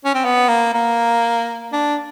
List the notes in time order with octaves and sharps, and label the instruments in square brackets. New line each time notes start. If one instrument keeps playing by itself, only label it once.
[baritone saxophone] C#4
C4
B3
A#3
A#3
D4